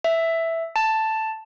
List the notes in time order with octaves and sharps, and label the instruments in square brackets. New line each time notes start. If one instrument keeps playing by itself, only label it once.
[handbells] E5
A5